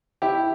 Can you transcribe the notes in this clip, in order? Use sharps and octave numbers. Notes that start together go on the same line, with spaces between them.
E4 G4